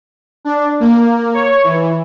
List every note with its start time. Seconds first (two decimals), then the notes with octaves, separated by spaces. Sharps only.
0.45 D4
0.80 A#3
1.34 C#5
1.64 E3